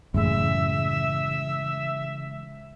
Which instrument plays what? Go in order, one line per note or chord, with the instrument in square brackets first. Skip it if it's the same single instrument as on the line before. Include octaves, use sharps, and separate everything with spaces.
[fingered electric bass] F#2 A2 [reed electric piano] C#3 E3 G#3 [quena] E5